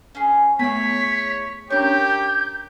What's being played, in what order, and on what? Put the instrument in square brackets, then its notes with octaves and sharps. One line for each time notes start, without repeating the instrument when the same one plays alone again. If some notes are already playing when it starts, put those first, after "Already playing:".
[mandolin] C#4 G#4
[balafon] A3 B3 [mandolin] E4 G#4 [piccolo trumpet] C#5 [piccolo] B6
[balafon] C#4 D4 C#5 [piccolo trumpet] G4 [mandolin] A#4 C#6 [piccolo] G6